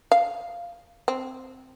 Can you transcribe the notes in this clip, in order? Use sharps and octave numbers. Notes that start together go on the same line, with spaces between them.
F5
C4